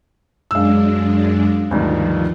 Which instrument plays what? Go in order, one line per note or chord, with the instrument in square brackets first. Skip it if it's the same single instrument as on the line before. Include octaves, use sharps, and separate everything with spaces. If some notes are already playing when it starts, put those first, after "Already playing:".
[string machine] F#2 G#3 D4 [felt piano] F5 E6
[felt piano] D2 G2 D#3 [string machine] F3